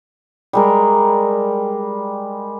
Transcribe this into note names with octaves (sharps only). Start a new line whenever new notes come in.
G3 G#3 A#4